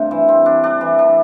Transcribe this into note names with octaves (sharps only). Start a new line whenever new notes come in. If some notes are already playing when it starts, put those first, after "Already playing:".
Already playing: G2 C3 A3
E3
C4
D4
D4
E3
D4